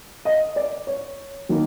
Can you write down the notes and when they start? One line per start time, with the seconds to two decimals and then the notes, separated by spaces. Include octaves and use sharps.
0.25 D#5
0.56 D5
0.87 C#5
1.49 D#3 F#3 A#3